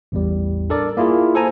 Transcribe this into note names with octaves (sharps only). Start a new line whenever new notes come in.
A1 E2 G3
D4 A4 A#4 D5
A#3 E4 F4 G#4
A4 C5 G#5 A#5